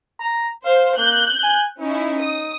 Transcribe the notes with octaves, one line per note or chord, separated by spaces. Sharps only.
A#5
C5 F5
A#3 F#6 G6
G#5
C#4 D#4 E4
D#6